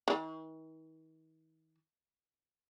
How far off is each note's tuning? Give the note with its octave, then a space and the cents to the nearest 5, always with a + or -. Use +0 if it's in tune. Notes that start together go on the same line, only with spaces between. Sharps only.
D#3 +45